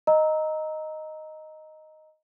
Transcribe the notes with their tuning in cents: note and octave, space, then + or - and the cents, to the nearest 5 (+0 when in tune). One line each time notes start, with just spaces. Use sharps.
D#5 +0 A#5 +0 E6 -25